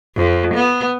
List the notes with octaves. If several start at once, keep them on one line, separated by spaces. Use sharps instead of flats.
F2
B3